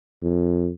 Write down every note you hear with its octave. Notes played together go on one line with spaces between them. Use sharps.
F2